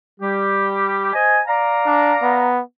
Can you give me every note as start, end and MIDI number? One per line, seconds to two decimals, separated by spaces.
0.20 1.09 55
0.20 1.09 67
1.14 1.40 72
1.14 1.40 75
1.14 1.40 80
1.46 2.50 74
1.46 2.50 77
1.46 2.50 82
1.86 2.14 62
2.22 2.62 59